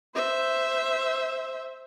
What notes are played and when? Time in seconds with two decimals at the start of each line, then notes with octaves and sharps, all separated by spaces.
0.15 C5 E5